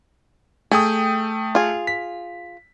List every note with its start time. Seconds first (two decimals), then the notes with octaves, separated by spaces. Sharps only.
0.71 A3 G#4 G5 D#6
1.55 F4 G#4
1.87 B6